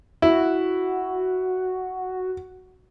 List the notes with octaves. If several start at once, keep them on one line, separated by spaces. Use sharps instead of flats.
E4 F#4